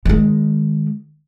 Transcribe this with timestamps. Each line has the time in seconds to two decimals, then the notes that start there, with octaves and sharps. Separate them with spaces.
0.05 D#3 G#3